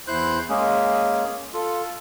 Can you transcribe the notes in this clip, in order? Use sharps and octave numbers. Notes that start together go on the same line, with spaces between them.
E2 E4 C5 C6 F#6 G6
G#3 A#3 C#4 G#4
F4 A4